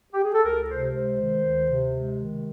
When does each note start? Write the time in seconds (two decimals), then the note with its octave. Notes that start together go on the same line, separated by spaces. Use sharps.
0.12 G4
0.23 G#4
0.34 A4
0.44 C#2 A#4
0.69 C3 C5
0.94 G#3 C5
1.19 D#3
1.44 D2
1.68 C3
1.94 G#3
2.18 D#3